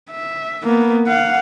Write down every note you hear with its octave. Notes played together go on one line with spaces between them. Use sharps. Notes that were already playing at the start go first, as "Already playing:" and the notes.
E5
A#3 B3
F5 F#5